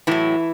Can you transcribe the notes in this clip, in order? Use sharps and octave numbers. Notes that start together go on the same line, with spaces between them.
A2 E3 F#3 E4